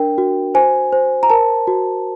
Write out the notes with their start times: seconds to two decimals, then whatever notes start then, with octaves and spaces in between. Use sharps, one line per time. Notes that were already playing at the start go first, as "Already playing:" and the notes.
Already playing: D4 A#4 G5
0.18 F#4
0.55 C5 G#5
0.93 C5
1.23 A#5
1.30 A#4 A5
1.67 F#4